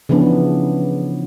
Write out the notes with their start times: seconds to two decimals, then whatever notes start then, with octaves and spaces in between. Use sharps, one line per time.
0.09 C#3 E3 F3 B3 D4